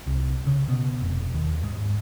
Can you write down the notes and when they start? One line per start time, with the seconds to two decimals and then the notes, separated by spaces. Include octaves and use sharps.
0.07 C2
0.47 C#3
0.69 B2
1.02 F1
1.34 D#2
1.63 G#2